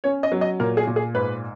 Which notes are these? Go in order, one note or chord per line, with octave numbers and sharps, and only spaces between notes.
C#4 C#5
D#5
F#3
D#5
A#2 A#4
G#4
A#2
G#4
G#2 B4